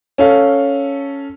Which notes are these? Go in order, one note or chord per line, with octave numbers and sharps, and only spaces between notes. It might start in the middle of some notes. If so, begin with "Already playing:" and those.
C#4 A4 F5